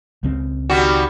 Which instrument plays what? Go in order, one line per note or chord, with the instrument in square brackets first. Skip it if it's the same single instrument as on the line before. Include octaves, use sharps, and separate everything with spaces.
[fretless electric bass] C#2 C#3 C4
[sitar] D#3 G3 F#4